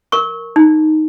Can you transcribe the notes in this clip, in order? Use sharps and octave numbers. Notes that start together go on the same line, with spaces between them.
A#4 C#6
D#4